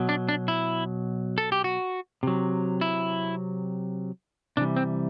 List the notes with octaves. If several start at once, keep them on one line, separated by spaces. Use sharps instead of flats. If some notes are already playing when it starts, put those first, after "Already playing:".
Already playing: B2 F#3
D4
D4
E4
A4
G4
F#4
C3 F#3
E4
C3 E3 G3 D4
C4